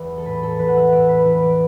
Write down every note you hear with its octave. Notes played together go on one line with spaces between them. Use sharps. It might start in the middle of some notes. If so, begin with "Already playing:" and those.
Already playing: E2 E3 B4 D5 E5
A4
A2 B4
A4
E3 B4
F#5
E5
A2 D5
B4
E3 B4
D5